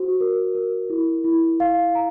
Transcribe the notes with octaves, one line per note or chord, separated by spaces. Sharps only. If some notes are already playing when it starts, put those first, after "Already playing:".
Already playing: F#4 C5
A#4
A#4
E4
E4
F5
A#5